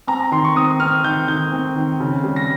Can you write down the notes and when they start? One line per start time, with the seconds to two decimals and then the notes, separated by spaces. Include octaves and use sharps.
0.07 C4 A#5
0.20 A#5
0.31 D#3 C6
0.44 C#6
0.56 C4 D#6
0.80 C4 F6
1.04 D#3 G6
1.28 D#3 G6
1.52 C4
1.76 D#3
2.00 C#3
2.23 G3
2.36 A#6